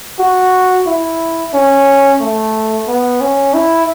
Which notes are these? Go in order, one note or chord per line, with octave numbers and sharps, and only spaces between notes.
F#4
E4
C#4
A3
B3
C#4
E4